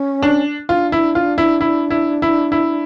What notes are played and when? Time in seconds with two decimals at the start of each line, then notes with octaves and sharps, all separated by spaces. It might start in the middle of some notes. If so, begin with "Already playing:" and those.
Already playing: C#4
0.22 D4
0.69 D4 F4
0.92 E4
1.15 F4
1.38 E4
1.61 E4
1.90 E4
2.22 E4
2.52 E4